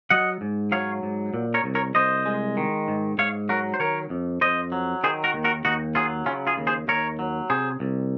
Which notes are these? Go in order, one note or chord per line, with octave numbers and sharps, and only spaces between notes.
F#3 D#5 F#5
G#2
F#3 C#5 F5
G#2
A#2
A#4 C#5
C2
A#4 C#5
C2 C5 D#5
G#3
D#3
G#2
G#2 C#5 F5
F#3 F#4 A#4
C5
D#3 A#4 C#5
F2
F2 C5 D#5
F#3
D#3 G#4 C5
F#4 A#4
D#2
F#4 A#4
D#2 D#4 F#4
F#3 F4 G#4
C#3 C#4 F4
F4 G#4
D#2
G#4 C5
D#2 A#4 C#5
F#3
C3 G#4 C5
C2